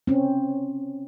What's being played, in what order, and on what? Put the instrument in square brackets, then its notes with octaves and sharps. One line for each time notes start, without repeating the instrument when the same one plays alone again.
[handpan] C4 C#4